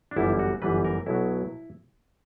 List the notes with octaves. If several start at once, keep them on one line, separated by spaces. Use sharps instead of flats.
D4
G1 F#2 E3 G3 E4
F#4
G1 F#2 E3 G3 B4
A#4
B1 B2 F#3 E4